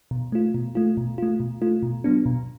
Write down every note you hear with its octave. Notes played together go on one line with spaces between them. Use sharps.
B2
A3 F4
B2
A3 F4
B2
A3 F4
B2
A3 F4
B2
F#3 B3 D4
B2